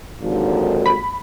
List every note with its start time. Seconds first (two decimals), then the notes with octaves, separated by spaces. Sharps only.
0.22 G#1 D#2 A#2 D3 F3
0.86 B5